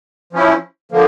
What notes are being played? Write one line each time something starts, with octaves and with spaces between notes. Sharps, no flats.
F3 C#4 E4
D3 F3 A#3